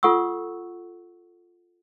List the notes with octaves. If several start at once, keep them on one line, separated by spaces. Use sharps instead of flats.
F4 A4 F#5 C#6 E6